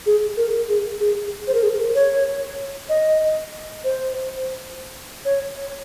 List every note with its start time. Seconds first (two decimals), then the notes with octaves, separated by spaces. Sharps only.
0.06 G#4
0.37 A#4
0.69 G#4
1.00 G#4
1.47 C5
1.54 A#4
1.63 G#4
1.69 A#4
1.95 C#5
2.89 D#5
3.84 C5
5.25 C#5